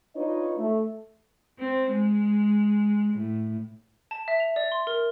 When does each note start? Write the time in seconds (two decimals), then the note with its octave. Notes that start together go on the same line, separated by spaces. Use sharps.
0.16 D4 D#4 F4 B4 C#5 D#5
0.58 A3
1.59 C4
1.92 G#3
3.13 A2
4.11 A5
4.28 E5
4.40 F7
4.56 D5
4.72 C6
4.87 A#4